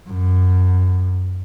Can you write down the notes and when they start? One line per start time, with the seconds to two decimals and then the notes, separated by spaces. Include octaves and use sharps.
0.09 F#2